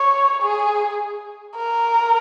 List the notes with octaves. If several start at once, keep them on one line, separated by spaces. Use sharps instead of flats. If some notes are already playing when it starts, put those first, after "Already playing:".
Already playing: C#5
G#4
A#4